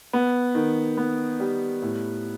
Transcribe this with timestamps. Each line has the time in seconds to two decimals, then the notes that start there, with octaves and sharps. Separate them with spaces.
0.13 B3
0.55 D#3
0.97 B3
1.40 G3
1.82 A2